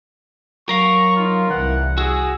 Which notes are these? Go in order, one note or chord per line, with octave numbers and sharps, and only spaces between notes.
F#3 A#4 F5 C#6
D#4 F4
C2 E3 F#5
F#4 G#4 E6